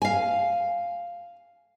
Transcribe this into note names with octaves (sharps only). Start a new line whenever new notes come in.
F5 G#5